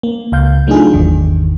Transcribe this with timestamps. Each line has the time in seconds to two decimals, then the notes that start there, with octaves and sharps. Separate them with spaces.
0.03 A#3
0.32 C#2 F5 G6
0.67 F#3 A3 D4 D#4 F4 G#4
0.93 G#1 E2 D#3